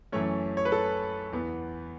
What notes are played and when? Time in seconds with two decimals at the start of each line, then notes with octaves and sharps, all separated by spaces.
0.12 F#2 E3 A3 C#4 C#5
0.57 C#5
0.65 B4
0.72 A4
1.32 E2 E3 B3